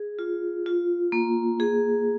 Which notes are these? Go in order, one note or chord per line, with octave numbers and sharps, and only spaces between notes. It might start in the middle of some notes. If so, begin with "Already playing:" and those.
Already playing: G#4
F4
F4
A#3
G#4